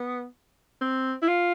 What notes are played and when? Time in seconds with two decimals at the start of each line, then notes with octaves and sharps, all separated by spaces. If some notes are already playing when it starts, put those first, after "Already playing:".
Already playing: B3
0.81 C4
1.22 E4
1.28 F4